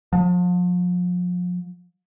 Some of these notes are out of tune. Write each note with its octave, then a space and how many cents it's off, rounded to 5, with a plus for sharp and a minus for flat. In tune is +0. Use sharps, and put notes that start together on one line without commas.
F3 +35